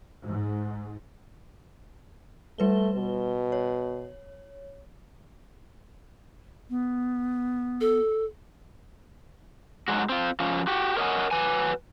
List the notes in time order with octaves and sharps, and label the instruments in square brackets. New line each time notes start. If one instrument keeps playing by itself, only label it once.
[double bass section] G#2
[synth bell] G3 B4 G7 [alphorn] A3
[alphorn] B2
[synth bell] C#5
[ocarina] B3
[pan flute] A4
[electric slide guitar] G#2 C3 F#3 G#3 F#4
C4 F4
F3 C#4 F4
F#4 G4
A#4 C#5 D#5 E5 F#5 G#5
F#3 B4 G#5